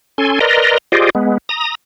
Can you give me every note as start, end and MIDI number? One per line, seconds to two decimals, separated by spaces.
0.18 0.39 61
0.18 0.39 69
0.18 0.39 80
0.18 0.39 84
0.41 0.78 70
0.41 0.78 71
0.41 0.78 74
0.41 0.78 75
0.41 0.78 82
0.41 0.78 84
0.92 1.10 65
0.92 1.10 67
0.92 1.10 68
0.92 1.10 72
0.92 1.10 74
0.92 1.10 75
1.15 1.38 56
1.15 1.38 59
1.49 1.75 82
1.49 1.75 87